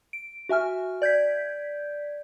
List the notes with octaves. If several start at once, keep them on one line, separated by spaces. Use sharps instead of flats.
D7
F#4 E5 G#5 F6
D5 G6 G#6 B6